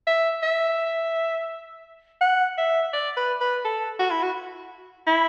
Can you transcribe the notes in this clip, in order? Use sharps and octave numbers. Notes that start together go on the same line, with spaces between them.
E5
E5
F#5
E5
D5
B4
B4
A4
F#4
E4
F#4
E4